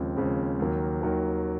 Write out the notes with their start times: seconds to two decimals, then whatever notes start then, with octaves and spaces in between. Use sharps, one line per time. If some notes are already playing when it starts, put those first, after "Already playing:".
Already playing: D#2 C#3 F3 G#3 C4
0.17 D#2 C#3 F3 G#3 C4
0.59 D#2 D#3 F#3 A#3
1.01 D#2 D#3 F#3 A#3